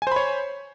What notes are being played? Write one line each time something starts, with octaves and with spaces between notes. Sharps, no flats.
C5 C#5 G#5 B5